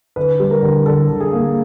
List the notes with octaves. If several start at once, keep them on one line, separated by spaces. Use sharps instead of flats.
D3 B4
G3
A#4
D3
D3 A4
D3
G#4
A#3